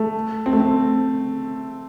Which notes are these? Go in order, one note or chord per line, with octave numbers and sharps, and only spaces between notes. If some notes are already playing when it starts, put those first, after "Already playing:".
Already playing: A3
C4
A3
C4